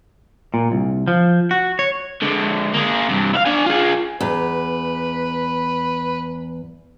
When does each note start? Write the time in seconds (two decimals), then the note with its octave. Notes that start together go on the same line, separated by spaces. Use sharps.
0.54 A#2
0.72 C2
1.08 F3
1.51 F#4
1.79 C#5
2.22 D3 G#3
2.74 A#3 G#4
3.09 G2 C3
3.33 E4 F5
3.46 D4 G#5
3.66 F4 G#4
4.20 E2 B4